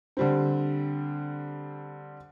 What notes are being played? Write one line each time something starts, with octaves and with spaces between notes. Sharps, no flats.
D3 G3 C4